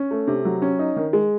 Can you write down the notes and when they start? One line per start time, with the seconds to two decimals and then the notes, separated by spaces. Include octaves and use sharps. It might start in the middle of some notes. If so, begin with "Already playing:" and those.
Already playing: C#4
0.11 A3
0.27 C3
0.45 F#3
0.62 C#4
0.79 D#4
0.96 D#3
1.13 G#3